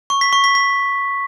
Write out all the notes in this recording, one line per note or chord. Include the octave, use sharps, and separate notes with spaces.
C#6
B6
C#6
B6
B6